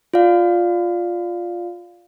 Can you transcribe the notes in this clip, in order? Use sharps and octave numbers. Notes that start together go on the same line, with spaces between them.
F4 D5 F5